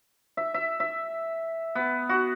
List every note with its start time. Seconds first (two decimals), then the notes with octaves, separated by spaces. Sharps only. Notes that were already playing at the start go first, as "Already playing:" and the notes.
0.37 E5
0.54 E5
0.80 E5
1.75 B3
2.09 F#4